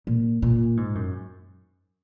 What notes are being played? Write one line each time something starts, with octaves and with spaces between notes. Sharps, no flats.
A#2
A#2
G#2
F#2